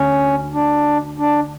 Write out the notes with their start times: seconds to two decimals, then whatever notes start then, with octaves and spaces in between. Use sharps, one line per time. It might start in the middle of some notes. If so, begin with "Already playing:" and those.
Already playing: D2 C#4
0.54 D4
1.18 D4